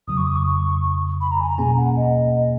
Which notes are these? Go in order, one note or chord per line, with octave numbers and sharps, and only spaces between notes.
F2 C#3 F#3 D#6
C#6
D#6
C#6
B5
A#5
G#5
A#5
B2 A#3 C#4 G#4 G#5
F#5
D#5